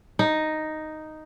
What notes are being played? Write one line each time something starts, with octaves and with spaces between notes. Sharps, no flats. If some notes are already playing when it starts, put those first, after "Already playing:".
D#4